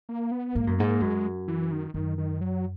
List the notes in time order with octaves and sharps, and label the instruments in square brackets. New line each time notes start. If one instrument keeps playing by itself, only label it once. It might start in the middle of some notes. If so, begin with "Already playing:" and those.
[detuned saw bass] A#3
B3
[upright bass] G#2 [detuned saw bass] A#3
[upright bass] F#2
[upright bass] G#2 [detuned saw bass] A#3
[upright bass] F#2 [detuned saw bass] G#3
[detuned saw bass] E3
D#3
[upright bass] F#2 [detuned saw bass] D#3
[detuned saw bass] D#3
F#3